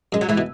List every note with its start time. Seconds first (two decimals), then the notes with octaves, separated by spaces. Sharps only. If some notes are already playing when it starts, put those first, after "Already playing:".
0.12 F#2 G#3
0.21 F#3
0.29 G#2 E3
0.38 B2